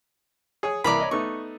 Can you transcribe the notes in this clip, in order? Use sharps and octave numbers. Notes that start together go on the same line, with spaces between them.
G#4 C#5 D#6
C2 E3 A#3 D5 A#5 B5
C#5 D#5
A3 B3 D#4 C#6